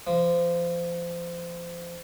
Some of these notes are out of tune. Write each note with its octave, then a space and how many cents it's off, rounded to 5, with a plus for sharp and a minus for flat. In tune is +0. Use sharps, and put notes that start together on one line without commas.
F3 -25